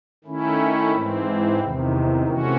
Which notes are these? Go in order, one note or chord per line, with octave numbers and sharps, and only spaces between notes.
D#3 A3 C#4 E4
G#2 E3 C4
E2 C3 D#3
C3 E3 A3 C#4 F#4